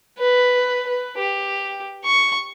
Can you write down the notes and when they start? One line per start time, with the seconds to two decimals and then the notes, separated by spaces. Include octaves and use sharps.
0.18 B4
0.87 B4
1.18 G4
2.05 C#6